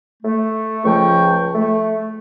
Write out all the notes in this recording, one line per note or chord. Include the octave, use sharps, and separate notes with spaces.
A3
C#2 F3 G5 C#6
A3